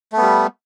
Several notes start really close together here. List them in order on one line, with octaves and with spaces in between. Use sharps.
A3 B3 G3